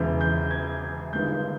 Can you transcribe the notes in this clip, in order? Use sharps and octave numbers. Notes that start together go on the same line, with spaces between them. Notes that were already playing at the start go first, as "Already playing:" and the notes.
Already playing: E1 E2 C#3 E3 G6
G6
G#6
G1 G2 D#3 G#3 G6